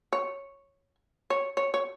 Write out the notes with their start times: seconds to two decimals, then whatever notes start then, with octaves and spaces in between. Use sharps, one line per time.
0.13 C#5
1.30 C#5
1.57 C#5
1.74 C#5